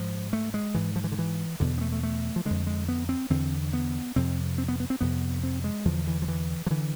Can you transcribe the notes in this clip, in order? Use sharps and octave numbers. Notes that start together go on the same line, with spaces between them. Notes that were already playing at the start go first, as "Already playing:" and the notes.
Already playing: G#2 F3
A3
G#3
G#2 E3
F3
E3
D3
E3
E2 B2 D3
B3
A3
A3
A3
F3
F2 D3 G#3
G#3
B3
C4
E2 D3 C4
B3
F2 C3 C4
C4
B3
B3
C4
F2 C3 B3
C4
G#3
E2 D3 F3
E3
F3
E3
F3
D3 E3